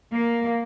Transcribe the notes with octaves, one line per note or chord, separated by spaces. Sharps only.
A#3